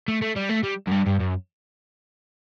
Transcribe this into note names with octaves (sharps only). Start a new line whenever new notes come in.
A3
A3
G3
A3
G3
F#2
G2
G2
F#2